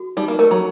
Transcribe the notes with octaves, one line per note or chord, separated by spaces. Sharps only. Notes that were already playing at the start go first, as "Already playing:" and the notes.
Already playing: F#4
G3 D#4
A#3
A3 A#4
F#3